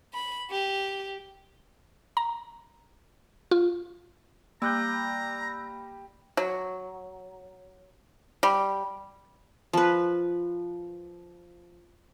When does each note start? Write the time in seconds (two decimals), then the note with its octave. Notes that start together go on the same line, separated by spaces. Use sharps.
0.14 B5
0.51 G4
2.17 A#5
3.51 F4
4.62 G3 A#3 A#5 E6 F#6 G6
6.37 F#3
8.43 G3
9.73 F3 B4